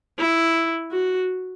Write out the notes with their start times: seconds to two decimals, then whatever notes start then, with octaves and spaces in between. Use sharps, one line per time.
0.18 E4
0.92 F#4